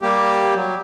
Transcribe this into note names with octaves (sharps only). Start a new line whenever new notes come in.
G3 A#3 G4
F#3